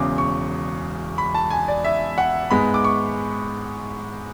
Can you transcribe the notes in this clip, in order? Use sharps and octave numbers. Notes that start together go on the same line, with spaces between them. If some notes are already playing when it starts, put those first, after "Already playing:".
Already playing: E1 E2 C#3 D6
C#6
B5
A5
G#5
D5
E5
F#5
G#2 G#3 B3 B5
D6
C#6